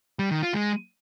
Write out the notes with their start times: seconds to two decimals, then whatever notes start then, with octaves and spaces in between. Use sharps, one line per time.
0.19 G3
0.31 D#3
0.43 F4
0.54 G#3